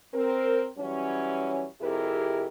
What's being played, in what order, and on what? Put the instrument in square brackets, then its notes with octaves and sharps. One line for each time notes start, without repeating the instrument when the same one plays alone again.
[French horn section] C4 A#4
E3 F#3 G3 C#4
F2 C3 E4 G4 G#4 A#4